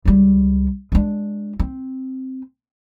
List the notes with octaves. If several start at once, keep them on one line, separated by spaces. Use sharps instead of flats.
C#2 G3
G#3 D4
C4